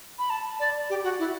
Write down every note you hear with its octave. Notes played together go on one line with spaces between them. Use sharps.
B5
A5
D5
G4
F#4
E4